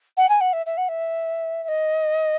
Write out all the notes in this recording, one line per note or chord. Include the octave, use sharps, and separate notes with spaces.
F#5
G#5
F#5
E5
E5
F#5
E5
E5
D#5